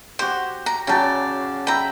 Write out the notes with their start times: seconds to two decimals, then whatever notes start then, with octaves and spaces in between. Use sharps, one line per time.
0.19 F#4 G4 C5
0.66 A#5
0.87 C#3 F#3 D5 G5 A5
1.67 E5 G5 A#5 B5